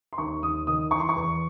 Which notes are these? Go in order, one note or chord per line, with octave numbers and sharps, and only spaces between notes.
C6
D#2 C#6
D#2 D#6
D#3 D#6
E3 C#6
C6
C#6
E2